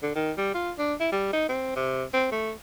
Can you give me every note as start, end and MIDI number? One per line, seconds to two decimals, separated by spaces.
0.03 0.10 50
0.15 0.32 51
0.38 0.52 55
0.54 0.72 65
0.79 0.94 62
1.00 1.10 64
1.12 1.32 55
1.33 1.48 63
1.49 1.74 60
1.76 2.04 48
2.14 2.28 60
2.32 2.52 57